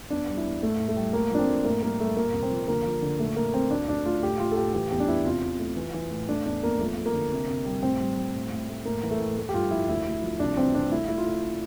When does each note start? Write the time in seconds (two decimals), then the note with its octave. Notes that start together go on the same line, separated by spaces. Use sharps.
0.10 E2 D4
0.28 G3
0.37 E4
0.45 E2
0.62 A2 A3
0.80 A2
0.88 A3
0.96 G3
1.13 A3 A#3
1.31 F3 D4
1.39 C4
1.48 A3
1.65 A2 A#3
1.83 G3 A#3
1.99 G3 A3
2.17 A#2 A#3
2.33 C2
2.43 C4
2.51 F3
2.68 D3 A#3
2.85 F3
3.02 D3
3.20 A#2 A3
3.37 A#2 A#3
3.54 A3 C4
3.71 D2 D4
3.88 D2 D4
4.06 A3 F4
4.22 A2 G4
4.39 A3 F4
4.52 A4
4.57 A2 G4
4.73 E3 G4
4.91 E2 G4
5.00 D4
5.08 E2 E4
5.25 C3 F4
5.43 C3
5.59 A3
5.76 E3
5.94 E3
6.11 A2
6.28 A3 D4
6.45 E2 D4
6.63 E2 A#3
6.79 F3 A3
6.97 A3
7.06 A#3
7.14 D3
7.31 C3
7.49 C3
7.65 G3
7.83 A2 C4
8.00 G3
8.18 G3
8.34 A2
8.51 A2
8.69 A3
8.85 A2 A#3
9.03 E3
9.11 A3
9.20 A2
9.37 A3
9.49 G4
9.54 G2 F4
9.71 F3 E4
9.88 D2 E4
10.06 D2
10.22 F3
10.40 C2 D4
10.57 E3 C4
10.75 C2 D4
10.91 A3 E4
11.08 A3 E4
11.18 F4
11.26 A3